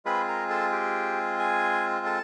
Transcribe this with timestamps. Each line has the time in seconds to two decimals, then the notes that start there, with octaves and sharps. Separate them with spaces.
0.05 G#3 C4 F4 G#4 B4 B5
0.29 A#4 A#5
0.50 A4 A5
0.72 G4 G5
1.39 G#4 G#5
2.06 A4 A5